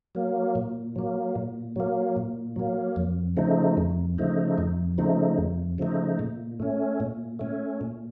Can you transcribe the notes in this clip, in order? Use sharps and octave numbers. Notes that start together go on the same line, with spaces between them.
F#3 A#3
A#2
F#3 A#3
A#2
F#3 A#3
A#2
F#3 A#3
F2
C#3 F3 A3 D#4
F2
C#3 F3 A3 D#4
F2
C#3 F3 A3 D#4
F2
C#3 F3 A3 D#4
A#2
A3 C#4
A#2
A3 C#4
A#2